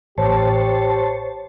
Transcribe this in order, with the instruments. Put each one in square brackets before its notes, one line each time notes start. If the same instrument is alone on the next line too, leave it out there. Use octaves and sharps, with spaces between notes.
[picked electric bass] A1 [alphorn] G4 [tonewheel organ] C5 C#5 A5